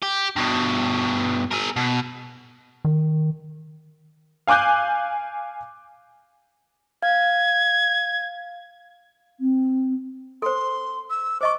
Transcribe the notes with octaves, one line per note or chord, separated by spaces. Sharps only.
G4
G2 B2
G#4 A#4
B2
D#3
F5 G#5 D6 F#6 G6
F5 G#6
C4
A4 C5 C6
E6
C5 D#5 C#6 D6